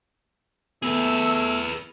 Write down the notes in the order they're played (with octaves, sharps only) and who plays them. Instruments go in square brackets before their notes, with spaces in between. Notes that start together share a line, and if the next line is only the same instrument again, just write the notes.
[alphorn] A3 [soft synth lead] B3 [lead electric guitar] G#4 B4 [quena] E6